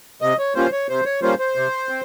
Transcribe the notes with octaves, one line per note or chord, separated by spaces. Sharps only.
C3 D#5
C#5
G3 A#3 C#4 F4 C5
C#5
C3 C5
C#5
G3 A#3 C#4 F4 C5
C5
C3
C4